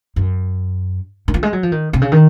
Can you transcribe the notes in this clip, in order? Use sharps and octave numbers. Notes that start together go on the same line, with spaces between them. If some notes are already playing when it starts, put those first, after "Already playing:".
F#2
D#3
F3
G#3
F#3
F3
D#3
C3
C#3
D#3